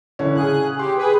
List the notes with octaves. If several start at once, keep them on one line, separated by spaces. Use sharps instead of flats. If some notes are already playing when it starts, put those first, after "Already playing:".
D3 E3 C#4
C#3 G#4 F#6
G4 C6
G#4 B4